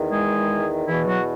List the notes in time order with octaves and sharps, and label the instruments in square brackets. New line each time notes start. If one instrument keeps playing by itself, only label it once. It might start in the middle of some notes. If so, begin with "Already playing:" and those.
Already playing: [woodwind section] E2 D#3
G#3 G#4
E2 B2 E3 E4
F#3 F#4